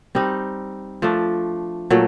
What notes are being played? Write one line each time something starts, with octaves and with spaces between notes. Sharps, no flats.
G3 C4 D#4
F3 A3 D4
A#2 F#3 A3